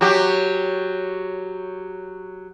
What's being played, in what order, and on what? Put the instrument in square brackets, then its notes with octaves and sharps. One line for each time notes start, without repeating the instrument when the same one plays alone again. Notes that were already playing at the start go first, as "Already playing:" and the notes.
[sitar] F#3 G4